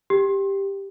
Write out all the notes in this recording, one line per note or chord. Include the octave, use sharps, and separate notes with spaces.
G4